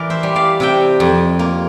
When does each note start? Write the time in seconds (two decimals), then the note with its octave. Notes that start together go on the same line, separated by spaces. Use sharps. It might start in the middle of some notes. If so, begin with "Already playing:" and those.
Already playing: E3 A#4 D5
0.10 C5 E5
0.23 G3
0.36 D5 F5
0.60 C3 E5 G5
1.00 F2
1.39 A#3